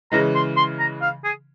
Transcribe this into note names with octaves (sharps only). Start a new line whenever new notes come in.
C#3 E3 G#3 A#5
C6
C6
A#5
F5
G#4